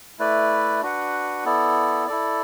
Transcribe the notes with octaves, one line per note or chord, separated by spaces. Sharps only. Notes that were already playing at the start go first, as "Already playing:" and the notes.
A3 E4 B4 D5
D4 F#4 B4 F#5
B3 E4 A4 D5
E4 A4 D5